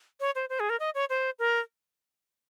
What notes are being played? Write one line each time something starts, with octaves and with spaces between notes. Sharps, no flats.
C#5
C5
C5
G#4
A#4
D#5
C#5
C5
A#4